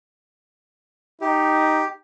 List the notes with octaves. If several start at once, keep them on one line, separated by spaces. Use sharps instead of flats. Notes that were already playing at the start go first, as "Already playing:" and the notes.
D#4 G4